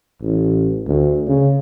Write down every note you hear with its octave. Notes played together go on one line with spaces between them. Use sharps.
A1
D2
C#3